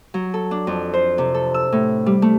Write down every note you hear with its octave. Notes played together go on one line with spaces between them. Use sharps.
F#3
A4
D4
F2
C5
C3
A4
E6
A2
G3
A3